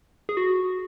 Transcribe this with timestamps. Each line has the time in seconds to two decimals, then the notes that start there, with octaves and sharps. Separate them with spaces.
0.29 G#4
0.37 F#4